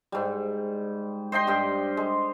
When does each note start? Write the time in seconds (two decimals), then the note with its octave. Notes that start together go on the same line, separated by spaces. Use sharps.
0.12 G#2 G3
1.32 C5 D#5 G5 C6
1.47 G2 G4
1.97 G#3